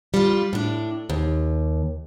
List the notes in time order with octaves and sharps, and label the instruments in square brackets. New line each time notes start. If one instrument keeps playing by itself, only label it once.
[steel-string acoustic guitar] G3 F4
A2 D4
D#2